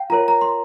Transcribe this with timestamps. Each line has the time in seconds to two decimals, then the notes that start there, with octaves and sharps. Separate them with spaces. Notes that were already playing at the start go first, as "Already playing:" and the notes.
Already playing: F5 G5
0.10 F4 A#4 C#5 A#5
0.28 A#5
0.41 C6